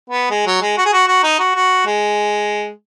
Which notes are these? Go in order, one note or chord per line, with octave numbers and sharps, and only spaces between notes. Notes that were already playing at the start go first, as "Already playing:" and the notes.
B3
G#3
F#3
G#3
F#4
G#4
F#4
F#4
D#4
F#4
F#4
G#3